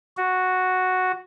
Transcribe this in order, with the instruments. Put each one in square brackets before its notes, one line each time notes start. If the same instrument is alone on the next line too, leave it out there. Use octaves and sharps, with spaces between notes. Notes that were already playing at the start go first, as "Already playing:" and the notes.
[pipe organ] F#4